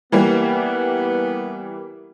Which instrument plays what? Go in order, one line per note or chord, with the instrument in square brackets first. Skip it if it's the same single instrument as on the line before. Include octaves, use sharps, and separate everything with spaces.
[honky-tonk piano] E3 G3 A#3 [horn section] B3